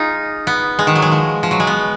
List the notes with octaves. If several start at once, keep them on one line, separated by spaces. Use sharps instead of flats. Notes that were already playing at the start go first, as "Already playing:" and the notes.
Already playing: D#4 F4 G#4
B3
G#3
D#3
F#3
G#3
F3
F3
F#3
G#3
B3